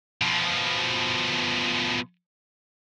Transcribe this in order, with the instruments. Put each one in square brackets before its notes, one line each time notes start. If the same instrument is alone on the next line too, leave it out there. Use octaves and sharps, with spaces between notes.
[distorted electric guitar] B2 F3